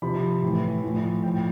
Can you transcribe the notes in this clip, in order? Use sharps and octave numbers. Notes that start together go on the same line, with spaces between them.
C3 F3 B5
A2 E3
A2 F3
A2 F3 G5